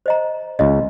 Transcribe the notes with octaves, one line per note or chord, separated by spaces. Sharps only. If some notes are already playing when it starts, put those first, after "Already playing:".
C5 D#5 A#5
C#2 C#3 D#5